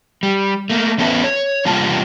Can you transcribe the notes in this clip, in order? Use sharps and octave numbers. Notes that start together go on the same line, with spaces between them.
G3
A3 A#3
E2 B3 C#4 A4 B4 E5
C#5
E2 C3 G3 A#3 F4 A5